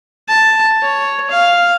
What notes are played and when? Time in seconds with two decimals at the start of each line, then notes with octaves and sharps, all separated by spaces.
0.28 A5
0.83 C#5
1.31 F5